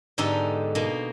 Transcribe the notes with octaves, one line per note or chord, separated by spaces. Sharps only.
G#2 D3 B3 D#4 G4 A4
B2 A#3 D#4